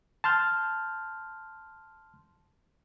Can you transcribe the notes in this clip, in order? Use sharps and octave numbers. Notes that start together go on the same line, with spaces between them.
A5 C6 F6 G6